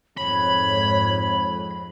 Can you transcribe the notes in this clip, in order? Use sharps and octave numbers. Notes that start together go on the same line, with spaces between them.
F2 G#2 C#5 B5